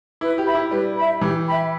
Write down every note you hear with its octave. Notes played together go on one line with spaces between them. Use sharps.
E4 B4
G4
E5 B5
E4
G3 B4
E5 B5
E3 G4
E5 G5 B5